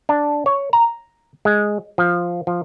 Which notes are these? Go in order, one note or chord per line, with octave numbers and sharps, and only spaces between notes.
D4
C#5
A#5
G#3
F3
F3